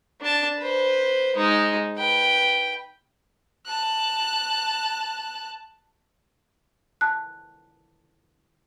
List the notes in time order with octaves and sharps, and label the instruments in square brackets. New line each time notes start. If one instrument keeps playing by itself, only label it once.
[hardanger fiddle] D4 A5
B4 C5
G#3 D#4
B4 G5
[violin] A5 F#6
[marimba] A5 F#6